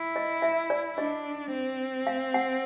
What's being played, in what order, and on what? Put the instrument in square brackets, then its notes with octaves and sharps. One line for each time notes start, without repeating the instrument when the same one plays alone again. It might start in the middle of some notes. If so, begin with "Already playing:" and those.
Already playing: [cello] E4
[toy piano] D#5
E5
D5
[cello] D4 [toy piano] D#5
[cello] C4
[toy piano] F5
F#5